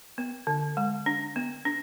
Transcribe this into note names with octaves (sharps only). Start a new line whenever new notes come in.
B3
D3
G#3
D4
B3
D4